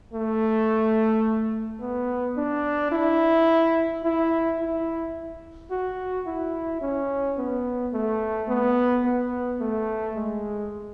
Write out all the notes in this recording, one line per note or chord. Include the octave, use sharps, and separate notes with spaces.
A3
B3
D4
E4
E4
E4
F#4
E4
C#4
B3
A3
B3
B3
A3
G#3